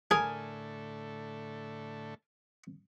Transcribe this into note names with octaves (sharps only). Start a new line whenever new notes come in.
A2 D3 A3 G#4 A#4 G#5